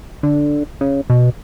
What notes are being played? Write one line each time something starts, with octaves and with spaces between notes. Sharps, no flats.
D3
C#3
B2